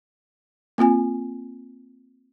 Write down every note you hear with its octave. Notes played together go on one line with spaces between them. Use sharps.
A#3 C4 F4 G#5